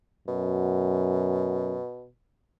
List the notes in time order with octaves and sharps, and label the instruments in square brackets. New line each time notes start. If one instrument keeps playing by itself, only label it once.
[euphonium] F#2 [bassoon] B2